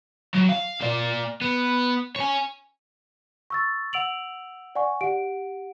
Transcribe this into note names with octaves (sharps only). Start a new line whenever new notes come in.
F#3
F5
A#3 D5
B3
C#5 G#5
C#6 E6 A6
F#5 E6 D7 F7 F#7
D5 F#5 G#5 C#6
G4 F#5 D7